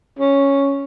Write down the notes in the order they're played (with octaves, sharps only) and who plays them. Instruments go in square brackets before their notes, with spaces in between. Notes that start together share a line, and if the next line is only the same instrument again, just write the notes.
[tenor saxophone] C#4